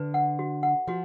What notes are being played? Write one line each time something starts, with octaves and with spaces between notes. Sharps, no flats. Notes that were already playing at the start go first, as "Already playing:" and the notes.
Already playing: D3 B4
F#5
F#4
F#5
F3 F#4